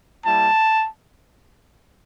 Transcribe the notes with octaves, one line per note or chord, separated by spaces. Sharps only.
G3 A#3 E4 A5